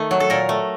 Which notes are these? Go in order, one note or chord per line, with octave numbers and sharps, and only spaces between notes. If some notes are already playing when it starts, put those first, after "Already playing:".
Already playing: D#3 A3
F#3
A4
A#2 A#4
A3